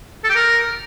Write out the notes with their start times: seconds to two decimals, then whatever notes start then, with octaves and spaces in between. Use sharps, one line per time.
0.24 A4
0.30 G4
0.35 A#4